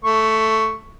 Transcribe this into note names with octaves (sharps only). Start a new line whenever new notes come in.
A3 C#6